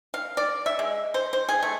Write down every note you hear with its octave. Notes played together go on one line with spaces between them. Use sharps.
F5
D5
E5
G#3
C5
C5
G#4
A3